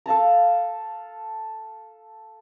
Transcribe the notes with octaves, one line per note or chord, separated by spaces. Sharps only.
A4 F5 A5 A#5